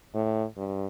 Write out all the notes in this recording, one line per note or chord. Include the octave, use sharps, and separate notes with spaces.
A2
G2